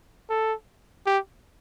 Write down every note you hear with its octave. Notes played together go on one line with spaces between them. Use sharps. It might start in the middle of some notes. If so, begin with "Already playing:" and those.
A4
G4